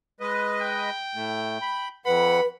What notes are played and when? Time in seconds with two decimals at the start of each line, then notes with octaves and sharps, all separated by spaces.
0.20 G#3 B4 D#5
0.62 G5
1.15 A2 A3
1.62 B5
2.06 F2 B4 F#5 B5